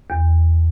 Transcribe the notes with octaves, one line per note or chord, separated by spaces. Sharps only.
E2